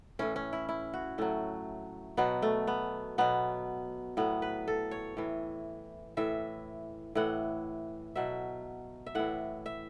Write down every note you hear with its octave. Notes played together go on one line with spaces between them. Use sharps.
A2 E3 C#4
C#4
E4
E4
F#4
A2 F#3 A3
B2 F#3 B3
A3
B3
B2 F#3 B3
A2 F#3 B3
B4
A4
C#5
A2 E3
A2 E3 E5
A2 E3 F#5
B2 F#3 E5
E5
A2 E3 F#5
E5